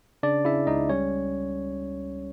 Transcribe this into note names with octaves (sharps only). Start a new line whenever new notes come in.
C#3 D4 D5
C#3 E4 E5
C#2 D#4 D#5
G3 C#4 C#5